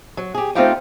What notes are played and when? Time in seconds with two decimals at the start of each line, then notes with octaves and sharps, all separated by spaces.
0.17 F#3
0.34 G4 G#4
0.55 A3 C4 D#4 F4 G4 G5